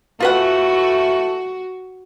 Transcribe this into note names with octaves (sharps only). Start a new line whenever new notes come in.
E3 A3 F4 F#4 B4 F#5